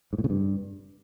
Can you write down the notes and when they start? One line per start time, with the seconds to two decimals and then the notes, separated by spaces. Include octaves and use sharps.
0.13 G#2
0.18 A2
0.24 C#3
0.30 G2